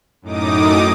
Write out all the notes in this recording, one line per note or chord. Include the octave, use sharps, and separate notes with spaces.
F#2 A2 D#4 D6 D#6